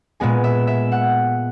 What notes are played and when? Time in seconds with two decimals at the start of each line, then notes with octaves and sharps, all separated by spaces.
0.20 A#2 G#3 B3 G#5
0.44 E5
0.67 E5
0.92 F#5